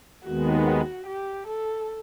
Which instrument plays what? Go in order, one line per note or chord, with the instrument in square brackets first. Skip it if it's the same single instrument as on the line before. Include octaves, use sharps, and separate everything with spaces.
[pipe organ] D#2 D#3 G#3 B3 [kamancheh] F#4
[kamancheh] F#4
G4
A4